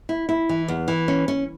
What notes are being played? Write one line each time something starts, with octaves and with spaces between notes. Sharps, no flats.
E4
E4
E3
E2
E3
C#4
C#4